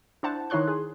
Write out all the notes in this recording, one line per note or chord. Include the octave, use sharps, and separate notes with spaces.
D4 E4 C5 F#5 A5
D#3 D#4 E4 C#5 C6 F#6
G#4